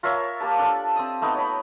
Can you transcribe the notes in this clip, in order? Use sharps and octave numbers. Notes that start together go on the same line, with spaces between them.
F4 A#4 C#5 E5
A#3 G4 A#4 A5
D4 A4 D5
C4 D#6
A3 B3 D#4 G5
C#5 B5